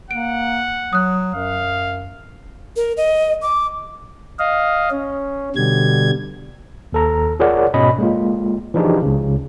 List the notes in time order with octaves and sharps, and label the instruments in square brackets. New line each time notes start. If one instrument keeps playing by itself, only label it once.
[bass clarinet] A#3 [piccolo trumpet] F#5 [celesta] D7
[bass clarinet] F#3 [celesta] D#6 F#6
[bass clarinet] F#2 [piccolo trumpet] F5
[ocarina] A#4
D#5
D6
[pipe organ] D#5 F5
C#4
B2 D3 G3 G#6
[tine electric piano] D#2 A4 A#5
F4 G#4 A#4 C#5 D5 F#5
G#2 B2 C#4 D#5 B5
G#3 A#3 F4
E3 F3 D4 D#4 G4 G#4
C#2 C#3